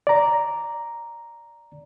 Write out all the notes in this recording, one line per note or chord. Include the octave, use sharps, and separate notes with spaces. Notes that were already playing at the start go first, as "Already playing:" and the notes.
D5 A#5